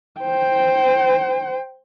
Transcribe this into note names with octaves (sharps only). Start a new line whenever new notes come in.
C5 G5